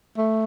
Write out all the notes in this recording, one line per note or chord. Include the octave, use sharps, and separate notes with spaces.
A3